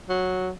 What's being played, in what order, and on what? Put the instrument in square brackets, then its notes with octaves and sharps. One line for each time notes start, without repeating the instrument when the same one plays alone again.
[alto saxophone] F#3